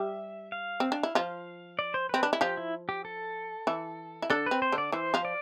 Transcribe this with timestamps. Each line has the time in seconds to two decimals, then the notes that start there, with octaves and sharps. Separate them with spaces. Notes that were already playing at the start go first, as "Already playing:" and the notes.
Already playing: G3 G4 E5
0.52 F5
0.80 C4
0.92 D4
1.03 E4
1.15 F3 F4
1.79 D5
1.94 C5
2.09 C4 B4
2.23 D4
2.33 E4
2.41 F3 F4 G4
2.57 E4
2.89 G4
3.05 A4
3.67 E3 E4
4.22 E4
4.30 D3 D4 A4
4.46 C4 B4
4.62 C5
4.72 D3 D4
4.78 D5
4.92 E3 E4 C5
5.14 F3 F4
5.25 D5